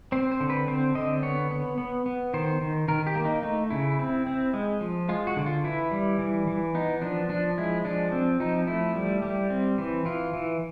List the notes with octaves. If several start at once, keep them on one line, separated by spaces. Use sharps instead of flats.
C4 C5
C5
D3
B4
C4 C5
D3 D#5
B3 C#5
B3
B3
B3
D#3 C5
D#3
D#3 A#4
G4
A#3
D#4
A3 D#4
C#3 E4
C4
C4
G#3
F3
G#3 F4
F#4
D3
F4
E3 E4
G3
E3
E3
B3 D#4
F3 D4
F3 D4
G#3 E4
F3 D4
C4
F3 D#4
A3 E4
G3
G3
C4
E3
E3 F4
E3